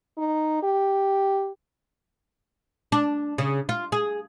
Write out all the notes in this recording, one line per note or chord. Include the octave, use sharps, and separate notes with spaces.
D#4
G4
D4
C#3
F4
G#4